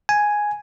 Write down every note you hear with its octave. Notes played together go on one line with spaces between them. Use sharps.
G#5